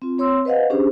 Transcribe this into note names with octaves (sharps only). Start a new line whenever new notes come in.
C4 F4
C4 C#5 C6 E6
B4 C5 D#5 F5 F#5
C#4 D4 G4 G#4 C5